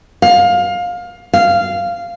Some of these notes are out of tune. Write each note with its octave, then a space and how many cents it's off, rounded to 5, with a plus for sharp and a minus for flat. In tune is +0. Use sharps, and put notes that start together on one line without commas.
F5 +20
F5 -10